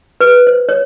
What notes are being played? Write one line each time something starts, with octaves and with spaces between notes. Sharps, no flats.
B4
C5
C#5